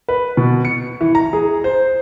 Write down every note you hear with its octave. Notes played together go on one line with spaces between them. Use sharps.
B4
B2
C#7
E3
A#5
G#4
C5